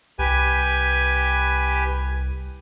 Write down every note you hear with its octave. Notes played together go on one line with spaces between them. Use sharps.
C2 G4 B4 G#5